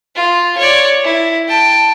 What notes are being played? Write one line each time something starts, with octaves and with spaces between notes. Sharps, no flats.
F4
C#5 D5
E4
G5 A5